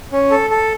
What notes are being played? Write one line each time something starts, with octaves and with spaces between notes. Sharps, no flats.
C#4
A4
A4